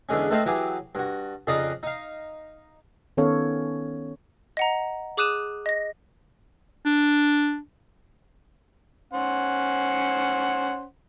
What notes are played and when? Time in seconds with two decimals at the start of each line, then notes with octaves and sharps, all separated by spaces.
0.09 E2 D3 G#3 C#4
0.31 A3 C4 B4 C5 D#5 F5
0.46 E3 F#3 G4 G#4
0.95 G2 F#4
1.47 F2 C#3 D#4 D5 A#5 D#6
1.83 D#4 F5
3.17 D#3 B3 C#4 A4 C#5 F5
4.57 D#5 F#5 A#5
5.17 G#4 D6 D#6 F#6 D#7 E7
5.66 D#5 A#6
6.85 D4
9.13 C#4 C5 F#5